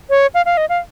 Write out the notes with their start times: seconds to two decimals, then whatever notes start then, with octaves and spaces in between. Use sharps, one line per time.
0.10 C#5
0.34 F5
0.46 F5
0.57 D#5
0.69 F5